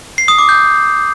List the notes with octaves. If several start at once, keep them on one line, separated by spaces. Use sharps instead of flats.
C7
D#6
D6
G6